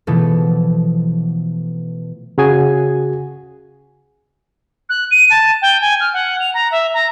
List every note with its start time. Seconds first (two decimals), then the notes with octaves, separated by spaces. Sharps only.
0.07 B2 E3 F3 A3
2.38 C#3 F#4 G#4 G#5
4.89 F#6
5.11 D#7
5.30 A5
5.61 G5
5.81 G#5
6.00 F6
6.13 F#5
6.40 F7
6.54 A#5
6.71 E5
6.93 A#5